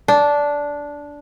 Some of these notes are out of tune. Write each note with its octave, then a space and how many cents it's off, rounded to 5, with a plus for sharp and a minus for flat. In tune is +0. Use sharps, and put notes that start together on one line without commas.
D4 -10